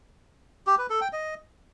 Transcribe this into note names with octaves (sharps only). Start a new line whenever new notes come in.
G4
B4
A4
G5
D#5